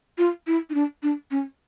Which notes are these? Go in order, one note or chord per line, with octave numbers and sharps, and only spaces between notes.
F4
E4
D#4
D4
D4
C#4